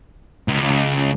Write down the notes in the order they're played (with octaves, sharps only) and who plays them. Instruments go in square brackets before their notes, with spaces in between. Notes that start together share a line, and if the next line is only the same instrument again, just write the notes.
[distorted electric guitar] C#2